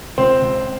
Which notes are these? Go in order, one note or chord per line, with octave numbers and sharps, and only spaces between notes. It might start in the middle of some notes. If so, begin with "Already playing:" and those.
C#2 C4 C5
C#2